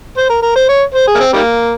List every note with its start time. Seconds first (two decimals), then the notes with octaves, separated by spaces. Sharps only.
0.17 C5
0.30 A#4
0.43 A#4
0.56 C5
0.69 C#5
0.94 C5
1.07 G#4
1.15 A#3
1.20 C4
1.33 D#3 G3 A#3